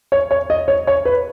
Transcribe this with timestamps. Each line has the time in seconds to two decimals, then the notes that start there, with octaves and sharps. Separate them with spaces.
0.12 C#5
0.31 C#5
0.50 D#5
0.68 C#5
0.87 C#5
1.05 B4